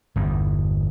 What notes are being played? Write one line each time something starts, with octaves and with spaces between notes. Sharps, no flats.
G1 E2